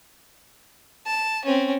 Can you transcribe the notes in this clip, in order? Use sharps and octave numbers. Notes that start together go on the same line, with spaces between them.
A5
C4 C#4